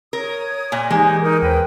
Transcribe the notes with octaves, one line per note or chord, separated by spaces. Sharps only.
A#4 C#5 D#6
A#2
E3 G#3 A#3 D#4 G4
D#4 A#4
D#2 B4 C5 G5